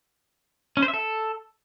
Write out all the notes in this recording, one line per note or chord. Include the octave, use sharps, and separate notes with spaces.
C#4
C5
E5
A4